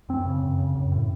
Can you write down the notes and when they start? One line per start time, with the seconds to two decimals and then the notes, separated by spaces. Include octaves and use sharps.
0.09 F#2 C4
0.26 C#3
0.43 F#2
0.59 C#3
0.76 F#2
0.92 A2